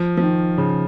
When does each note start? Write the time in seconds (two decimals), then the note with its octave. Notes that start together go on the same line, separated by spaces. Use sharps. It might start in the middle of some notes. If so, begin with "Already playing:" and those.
Already playing: F3
0.17 F3
0.22 D#3
0.58 C#3